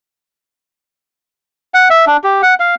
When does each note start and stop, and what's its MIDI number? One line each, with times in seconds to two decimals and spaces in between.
1.74 1.88 78
1.90 2.05 76
2.07 2.17 62
2.24 2.42 67
2.42 2.54 78
2.60 2.75 77